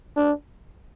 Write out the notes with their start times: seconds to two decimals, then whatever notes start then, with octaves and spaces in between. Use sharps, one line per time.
0.16 D4